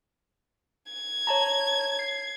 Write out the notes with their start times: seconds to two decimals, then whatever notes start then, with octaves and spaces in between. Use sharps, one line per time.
0.92 G#6
1.27 C#5 A5 A#5
1.99 C7